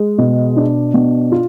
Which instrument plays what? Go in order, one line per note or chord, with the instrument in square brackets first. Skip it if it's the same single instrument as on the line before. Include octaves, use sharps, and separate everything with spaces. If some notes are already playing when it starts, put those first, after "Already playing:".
Already playing: [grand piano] G#3
B2
D4
B2
F4